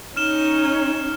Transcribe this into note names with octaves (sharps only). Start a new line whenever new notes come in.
C#4 D#4 F6 E7 G7